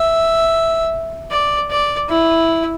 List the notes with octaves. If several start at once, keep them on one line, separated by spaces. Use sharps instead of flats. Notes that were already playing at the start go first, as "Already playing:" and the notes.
Already playing: E5
D5
D5
E4